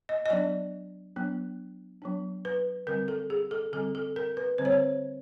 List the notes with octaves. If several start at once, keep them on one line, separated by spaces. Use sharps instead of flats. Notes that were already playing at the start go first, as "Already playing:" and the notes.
D#5
D#5
F#3 B3 D4 D5
F#3 B3 D4
F#3 B3 D4
B4
D3 G3 C4 A#4
A4
G#4
A4
D3 G3 C4 A4
A4
A#4
B4
D3 G3 C4 C5
C#5
C5